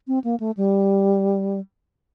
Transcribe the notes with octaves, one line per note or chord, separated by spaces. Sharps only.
C4
A#3
A3
G3